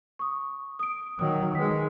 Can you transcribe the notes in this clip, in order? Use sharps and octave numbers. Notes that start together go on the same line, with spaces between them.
C#6 D#6
D#6 D7
D#3 F#3 D#6
D#3 G#3 B4 B6